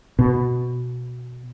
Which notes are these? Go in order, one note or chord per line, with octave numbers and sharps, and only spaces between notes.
B2